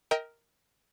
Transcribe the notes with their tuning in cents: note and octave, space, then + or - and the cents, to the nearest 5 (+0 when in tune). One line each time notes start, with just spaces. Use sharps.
A#4 +0 D#5 +35 G5 +0